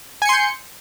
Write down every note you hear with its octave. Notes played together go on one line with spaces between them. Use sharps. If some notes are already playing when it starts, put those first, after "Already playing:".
G#5 C6 G6 C#7